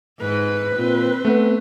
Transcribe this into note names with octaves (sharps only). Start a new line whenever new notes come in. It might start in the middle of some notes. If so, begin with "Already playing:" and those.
G#2 B4
A#2 C4
A3 B3